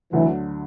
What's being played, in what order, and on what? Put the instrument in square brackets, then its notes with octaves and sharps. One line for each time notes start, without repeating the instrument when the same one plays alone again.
[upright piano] D2 D3 F#3 [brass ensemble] E3